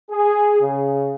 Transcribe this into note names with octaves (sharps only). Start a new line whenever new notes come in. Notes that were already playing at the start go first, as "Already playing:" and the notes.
G#4
C#3